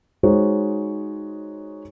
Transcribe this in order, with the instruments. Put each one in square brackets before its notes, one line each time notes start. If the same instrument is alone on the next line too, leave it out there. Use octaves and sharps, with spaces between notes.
[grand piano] G#3 D#4 F#4 G#4 C5 C#5